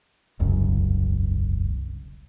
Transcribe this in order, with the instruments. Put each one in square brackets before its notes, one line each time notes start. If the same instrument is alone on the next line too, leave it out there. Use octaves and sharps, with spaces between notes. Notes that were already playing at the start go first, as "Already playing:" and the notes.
[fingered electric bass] E1 C2 F#2 C#3